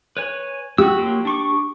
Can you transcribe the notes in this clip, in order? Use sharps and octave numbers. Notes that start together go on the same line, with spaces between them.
B4 C#5 G#5
F#4 G4 E6
F#3 A#3 F4
D4 C#6 D6